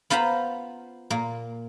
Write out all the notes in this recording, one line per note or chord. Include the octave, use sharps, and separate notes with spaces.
B3 F4 C5 A#5 B5
A#2 A#3